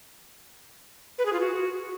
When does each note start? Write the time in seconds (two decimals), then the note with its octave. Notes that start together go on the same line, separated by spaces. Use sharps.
1.18 B4
1.26 G#4
1.33 F4
1.40 F#4